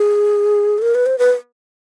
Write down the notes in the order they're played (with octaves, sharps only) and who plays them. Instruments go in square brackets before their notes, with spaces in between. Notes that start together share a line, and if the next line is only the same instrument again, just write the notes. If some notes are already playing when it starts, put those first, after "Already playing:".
Already playing: [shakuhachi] G#4
A4
A#4
B4
C5
B4